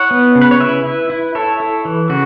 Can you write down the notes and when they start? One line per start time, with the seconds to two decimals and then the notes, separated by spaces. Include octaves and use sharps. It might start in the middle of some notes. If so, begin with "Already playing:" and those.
Already playing: E4 C#5 F#5
0.11 B3
0.35 C#3
0.42 B4
0.51 C#5
0.60 E4 B4 E5
0.85 E4
1.10 E4
1.35 E4 A4 C#5
1.60 E4
1.85 E3
2.10 C#3 F#4